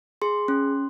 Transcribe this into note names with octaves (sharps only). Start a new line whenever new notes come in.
G#4 C6
C#4